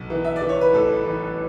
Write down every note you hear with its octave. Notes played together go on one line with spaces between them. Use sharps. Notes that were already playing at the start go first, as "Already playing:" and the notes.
Already playing: B1
E3
E5
D5
E3
C#5
B4
A1 A4
E3